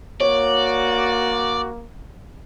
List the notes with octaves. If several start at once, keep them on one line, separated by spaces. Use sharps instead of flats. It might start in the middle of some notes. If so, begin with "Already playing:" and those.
A#3 F#4 C#5 D5